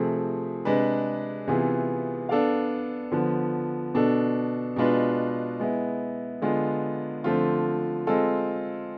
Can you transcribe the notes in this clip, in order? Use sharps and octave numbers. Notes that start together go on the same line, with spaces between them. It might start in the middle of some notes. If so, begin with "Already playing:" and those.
Already playing: C3 F3 A3 C4 G#4
C3 G#3 D4 G#4 B4
C3 E3 B3 F4 G#4
B3 D4 A4 D5 F5
D3 F3 B3
B2 B3 D4 A4
B2 G#3 D4 F4 B4
G#3 B3 E4
D3 G#3 B3 F4
D3 F3 A3 C4 F4
G#3 C4 F4 A4